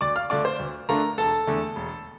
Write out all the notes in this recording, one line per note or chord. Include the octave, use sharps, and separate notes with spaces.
D2 D5 D6
F5 F6
D3 A3 D4 F4 D5 D6
C5 C6
D2
D3 A3 D4 F4 A#4 A#5
E1 A4 A5
E2 D3 A3
E1